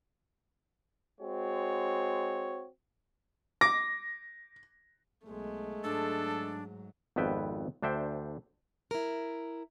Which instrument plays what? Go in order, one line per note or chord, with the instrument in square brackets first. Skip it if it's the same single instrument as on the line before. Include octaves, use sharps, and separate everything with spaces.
[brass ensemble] G#3 C4 F#4 C#5
[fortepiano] D6 [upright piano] A#6
[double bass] B1 [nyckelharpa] G#3 A3
[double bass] G#2 F#3 [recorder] D4 [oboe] A4
[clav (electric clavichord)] G#1 F2 B3 B4 E5 G5
D2 D4 C5 E5 G5
[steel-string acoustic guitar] E4 A#4